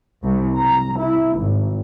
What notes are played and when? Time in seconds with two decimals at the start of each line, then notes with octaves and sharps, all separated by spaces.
0.23 C2
0.58 A#5
1.01 E4
1.41 G#1